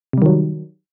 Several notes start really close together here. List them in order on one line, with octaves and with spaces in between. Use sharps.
C3 G3 D#3 F#3